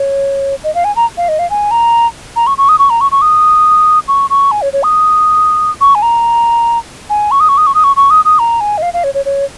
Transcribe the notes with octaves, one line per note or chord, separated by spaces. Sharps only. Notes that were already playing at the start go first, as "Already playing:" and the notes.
Already playing: C#5
D#5
F5
G#5
A#5
F5
D#5
F5
G#5
A#5
A#5
C#6
C#6
D#6
C#6
A#5
C#6
C#6
D#6
C#6
C#6
G#5
C#5
C#5
D#6
C#6
G#5
A#5
G#5
C#6
D#6
C#6
D#6
C#6
D#6
C#6
C#6
D#6
D#6
A#5
G#5
D#5
F5
F5
C#5
C#5
C#5